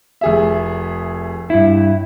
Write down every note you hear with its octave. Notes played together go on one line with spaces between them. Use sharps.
F1 G#4 E5
G2 E4